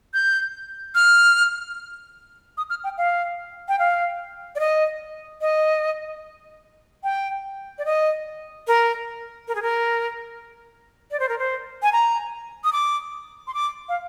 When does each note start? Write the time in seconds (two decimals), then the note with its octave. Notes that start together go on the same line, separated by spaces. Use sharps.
0.14 G6
0.95 F6
2.57 D#6
2.70 F6
2.84 G5
2.98 F5
3.68 G5
3.79 F5
4.55 D5
4.60 D#5
5.41 D#5
7.04 G5
7.78 D5
7.85 D#5
8.67 A#4
9.48 A#4
9.55 G#4
9.62 A#4
11.11 D5
11.20 C5
11.29 A#4
11.39 C5
11.83 G#5
11.92 A#5
12.64 D#6
12.73 D6
13.47 C6
13.54 D6
13.89 F5